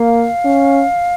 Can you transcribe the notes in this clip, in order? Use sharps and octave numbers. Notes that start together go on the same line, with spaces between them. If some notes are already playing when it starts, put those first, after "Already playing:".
Already playing: A#3 F5
C#4